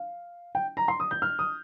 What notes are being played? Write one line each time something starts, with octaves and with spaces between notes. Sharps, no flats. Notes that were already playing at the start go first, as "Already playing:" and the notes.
Already playing: F5
G5
A#5
C6
D#6
G6
F6
D#6